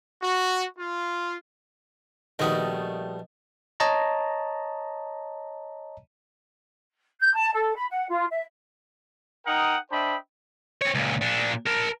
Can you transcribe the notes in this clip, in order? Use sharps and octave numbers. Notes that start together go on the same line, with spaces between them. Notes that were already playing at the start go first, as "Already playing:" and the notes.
F#4
F4
A#1 D#3 G3 A3 B3 F#4 D#5 D#6
C#5 D#5 A5 A#5
G6
A5
A4
B5
F#5
F4
E5
D#4 A#4 F#5 G5 D#6
D4 C5 D#5 E5 G5 B5
C4 C#5
C#2 A#2
A#2 D4
A#4 A5